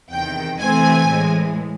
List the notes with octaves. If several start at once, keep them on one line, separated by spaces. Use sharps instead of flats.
E2 C3 D#3 G5
C3 E3 A3 C4 G#5
A2 E3 G#3